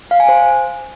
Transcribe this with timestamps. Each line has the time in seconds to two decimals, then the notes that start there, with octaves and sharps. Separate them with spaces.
0.11 F5
0.20 G#5
0.29 C5